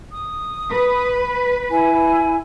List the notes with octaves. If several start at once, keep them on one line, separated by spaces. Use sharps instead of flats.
D#6
B4
E4 G#5 B5